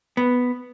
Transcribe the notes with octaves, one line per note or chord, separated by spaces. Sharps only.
B3